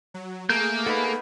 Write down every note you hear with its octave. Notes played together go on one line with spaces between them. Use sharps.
F#3
A3 A#3 G#4 A#4 G6
B3 D#4 A4 B4